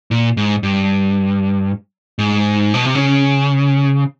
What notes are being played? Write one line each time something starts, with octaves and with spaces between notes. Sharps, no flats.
A#2
G#2
G2
G#2
B2
C3
C#3